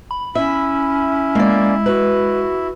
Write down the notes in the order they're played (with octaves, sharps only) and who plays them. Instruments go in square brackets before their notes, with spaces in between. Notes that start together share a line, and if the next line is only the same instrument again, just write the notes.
[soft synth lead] B5
[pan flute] C#4 [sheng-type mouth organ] E4 [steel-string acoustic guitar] E5
[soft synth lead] G#3 [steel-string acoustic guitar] A#3 D5
[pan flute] F#4 [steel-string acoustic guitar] B4